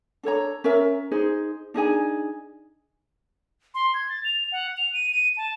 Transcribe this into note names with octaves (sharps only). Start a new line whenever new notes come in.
D4 A4 C#5 A#5
C#4 A#4 E5 A#5
D#4 G#4 C5
D4 D#4 G#4 G#5
C6
G#6
A6
F7
F#5
F7
D#7
D#7
A5